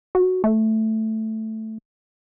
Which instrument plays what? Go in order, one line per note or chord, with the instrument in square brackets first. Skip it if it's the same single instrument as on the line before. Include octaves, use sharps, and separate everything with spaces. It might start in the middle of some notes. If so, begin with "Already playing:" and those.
[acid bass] F#4
A3